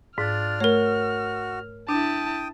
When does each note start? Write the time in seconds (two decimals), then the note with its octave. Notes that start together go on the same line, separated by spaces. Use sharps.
0.18 G#2 D4 F4 D5 F6
0.60 A3 F#4 A#4 C#5
1.89 D4 E4 G5 A5 D#6